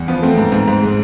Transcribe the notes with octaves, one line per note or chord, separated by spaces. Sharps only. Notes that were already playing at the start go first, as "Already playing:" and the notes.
Already playing: E2
F3 B3
A3 C4
G#2
G#2
G#2
G#3